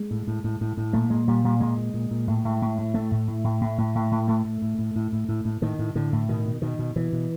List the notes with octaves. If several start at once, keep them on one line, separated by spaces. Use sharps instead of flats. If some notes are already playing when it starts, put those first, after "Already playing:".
Already playing: G#3
A2
A2
A2
A2
A2
A#2 A3
A#2 G#3
A#2 G3
A#2 G3
A#2 G#3
A#2
A#2
A#2
A2
A2
A2
A2
A2 A3
A2
A2
A2
A2
A2
A2
A2
A2 A3
A2
A2
A2
A2
A2
A2
A2
A2 D#3
A2
A2 D3
A2
B2 D#3
B2
B2 D#3
B2
B2 E3
B2